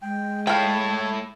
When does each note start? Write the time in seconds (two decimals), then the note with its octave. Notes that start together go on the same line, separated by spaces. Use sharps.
0.02 G#3 G5
0.47 A2 E4 C#5 E5 F5 G5 A5